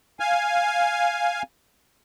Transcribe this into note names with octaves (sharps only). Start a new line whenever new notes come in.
F5 G#5